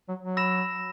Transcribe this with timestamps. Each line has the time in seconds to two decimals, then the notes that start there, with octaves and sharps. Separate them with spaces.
0.09 F#3
0.23 F#3
0.37 B5 E6 A#6 E7